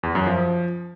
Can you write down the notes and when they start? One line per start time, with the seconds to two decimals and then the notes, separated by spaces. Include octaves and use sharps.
0.03 E2
0.15 F#2
0.27 F3